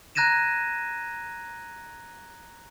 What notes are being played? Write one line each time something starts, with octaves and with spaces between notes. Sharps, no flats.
A#5 F#6 G#6 A#6 D#7 E7